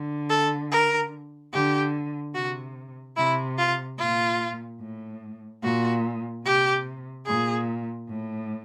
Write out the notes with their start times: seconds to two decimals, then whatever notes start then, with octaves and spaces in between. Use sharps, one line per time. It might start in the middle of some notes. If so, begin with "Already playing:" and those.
Already playing: D3
0.30 A4
0.72 A#4
1.53 D3 G4
2.35 C3 F#4
3.16 C3 E4
3.58 F4
3.99 A#2 F4
4.80 A2
5.63 A#2 F#4
6.45 C3 G4
7.26 A#2 G#4
8.09 A2